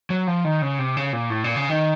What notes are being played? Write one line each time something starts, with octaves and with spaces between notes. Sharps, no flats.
F#3
F3
D#3
C#3
C3
C#3
A#2
A2
A#2
C#3
D#3